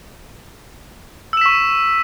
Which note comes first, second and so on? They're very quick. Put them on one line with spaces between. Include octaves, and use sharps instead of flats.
E6 E7 B6 C#6